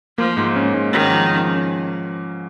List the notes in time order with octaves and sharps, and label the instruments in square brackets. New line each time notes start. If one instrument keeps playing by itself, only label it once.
[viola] F3 [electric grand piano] A#3
[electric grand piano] G#2
C#4
G#2
[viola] D#3 [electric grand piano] C#4
[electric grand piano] F3
C#4
C#4